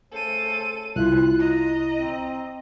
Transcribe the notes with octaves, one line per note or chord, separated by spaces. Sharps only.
C#3 A3 A4 C5 D#7
C2 E4 F4 F#6
D#5 A#5
C4